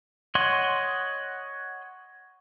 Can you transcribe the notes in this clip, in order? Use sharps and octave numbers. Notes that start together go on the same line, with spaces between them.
C#5 D#5 F#5 C6